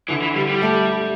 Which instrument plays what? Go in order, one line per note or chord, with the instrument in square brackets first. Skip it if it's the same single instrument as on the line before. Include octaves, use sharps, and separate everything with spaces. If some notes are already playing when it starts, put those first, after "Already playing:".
[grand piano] D3 [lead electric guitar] E3
[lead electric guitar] E3
G3
G3
[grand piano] A3